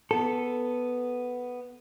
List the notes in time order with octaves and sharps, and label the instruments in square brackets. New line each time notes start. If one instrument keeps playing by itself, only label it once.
[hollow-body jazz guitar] B3 A4